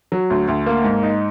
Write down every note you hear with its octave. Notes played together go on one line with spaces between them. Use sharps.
F#3
D2
D2
A#3
G#2
D#4